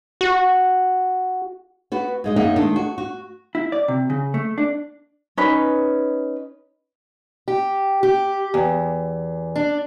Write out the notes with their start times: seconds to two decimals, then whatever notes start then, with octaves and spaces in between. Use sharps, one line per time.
0.21 F#4
1.92 B3 F#4 B4
2.24 G#2 G#3 D#5
2.36 F#2 A#3 D#4 G#4 E5 F#5
2.56 D#3 G#3 A3 D4
2.76 F#4
2.98 F#4
3.55 E4
3.72 D5
3.88 C3
4.10 C#3
4.34 A3
4.58 D4
5.37 C#4 D#4 B4
7.48 G4
8.03 G4
8.54 E2
9.56 D4